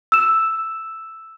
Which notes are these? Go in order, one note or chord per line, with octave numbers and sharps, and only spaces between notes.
E6 E7